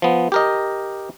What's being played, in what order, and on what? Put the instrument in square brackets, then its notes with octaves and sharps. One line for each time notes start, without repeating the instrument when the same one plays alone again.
[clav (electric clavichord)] F3 B3
G4 A#4 D#5